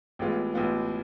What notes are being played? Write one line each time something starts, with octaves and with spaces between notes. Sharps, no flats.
A1 A2 G#3 B3 F4
A1 A2 G#3 B3 F4